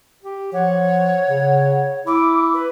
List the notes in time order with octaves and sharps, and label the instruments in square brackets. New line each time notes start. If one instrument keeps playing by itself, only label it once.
[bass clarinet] G4
[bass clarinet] F3 [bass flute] C#5 [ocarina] F#5
[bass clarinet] C#3
[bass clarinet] E4 [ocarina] D6
[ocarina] B4